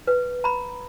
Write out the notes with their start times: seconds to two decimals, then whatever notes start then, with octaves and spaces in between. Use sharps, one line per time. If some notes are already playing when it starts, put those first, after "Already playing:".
0.07 B4
0.44 A#5 B5